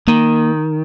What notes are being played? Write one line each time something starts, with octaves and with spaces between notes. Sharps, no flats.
D#3 A#3